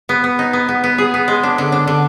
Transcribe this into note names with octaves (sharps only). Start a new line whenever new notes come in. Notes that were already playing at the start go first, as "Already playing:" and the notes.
B3
B3
D#4
B3
B3
B3
G#4
B3
G#3
D4
D3
D4
D3